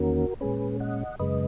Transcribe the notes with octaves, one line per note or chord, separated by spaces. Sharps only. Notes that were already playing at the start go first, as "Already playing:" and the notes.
Already playing: E2 D#3 A#3 C#4 F#4 A#4
A#2 G#3 C#4 G#4 B4
D#5 F#5
F#2 C#3 G#3 B4 D#5